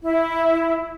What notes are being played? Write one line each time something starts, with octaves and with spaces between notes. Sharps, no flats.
E4